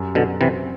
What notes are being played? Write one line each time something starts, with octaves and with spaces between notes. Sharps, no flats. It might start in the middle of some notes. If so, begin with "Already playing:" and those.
Already playing: F#2 G3
B2 D3 F#3
C3 E3 C4